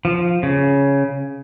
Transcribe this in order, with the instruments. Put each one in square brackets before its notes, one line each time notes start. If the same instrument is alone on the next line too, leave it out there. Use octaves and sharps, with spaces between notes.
[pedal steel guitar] F3
C#3